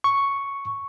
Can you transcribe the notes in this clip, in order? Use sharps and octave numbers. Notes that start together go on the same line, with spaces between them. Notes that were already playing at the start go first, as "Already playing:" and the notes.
C#6